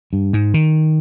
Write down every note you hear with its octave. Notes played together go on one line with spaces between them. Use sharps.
G2
G#2
D#3